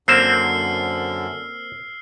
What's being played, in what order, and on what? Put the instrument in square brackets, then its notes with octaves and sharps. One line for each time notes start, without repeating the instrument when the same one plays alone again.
[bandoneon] F#2 D3 [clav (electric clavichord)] A#3 C4 C5 [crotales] E6 F6 C7